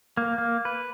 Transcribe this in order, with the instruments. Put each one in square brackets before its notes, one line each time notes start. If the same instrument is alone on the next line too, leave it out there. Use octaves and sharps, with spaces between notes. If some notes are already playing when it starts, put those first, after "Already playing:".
[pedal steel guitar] A#3
A#3
B4